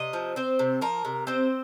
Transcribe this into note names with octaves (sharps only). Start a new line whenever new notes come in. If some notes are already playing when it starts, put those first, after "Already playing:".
Already playing: C3 D#5
F3
C4 C5
C3
F3 A#4
C3
C4 C5